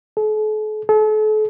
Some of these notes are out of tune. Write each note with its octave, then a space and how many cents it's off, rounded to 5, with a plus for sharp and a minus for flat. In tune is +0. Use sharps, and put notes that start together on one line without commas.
A4 -45
A4 -40